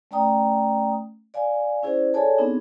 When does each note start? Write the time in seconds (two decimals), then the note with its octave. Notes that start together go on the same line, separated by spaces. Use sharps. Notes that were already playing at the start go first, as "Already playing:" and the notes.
0.11 A3 C#4 D5 G5 A#5 D#6
1.34 D5 F5 G#5
1.83 C#4 E4 G#4 C5 D5
2.14 G#4 A4 C#5 D5 G#5 A5
2.38 B3 C4 D4 D#4 G#4